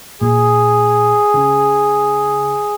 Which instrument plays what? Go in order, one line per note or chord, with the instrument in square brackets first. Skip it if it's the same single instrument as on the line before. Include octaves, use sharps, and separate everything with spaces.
[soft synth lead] A#2 [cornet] G#4
[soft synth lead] C#3